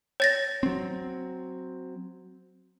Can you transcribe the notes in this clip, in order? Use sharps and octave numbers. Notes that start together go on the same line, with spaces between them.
C#5 A6 A#6
F#3 C4